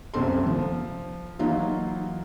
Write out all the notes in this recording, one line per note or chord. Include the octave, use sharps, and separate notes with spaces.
C2 F#2 C4 A4 C6
F3
E3 F#3 A#3 D#4 F4